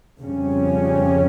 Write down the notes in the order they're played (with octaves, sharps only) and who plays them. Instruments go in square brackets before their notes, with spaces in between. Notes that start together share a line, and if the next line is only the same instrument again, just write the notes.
[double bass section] F2 C#3 G3 C#4